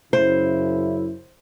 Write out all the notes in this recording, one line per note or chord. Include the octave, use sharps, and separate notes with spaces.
F#2 C#3 E4 C5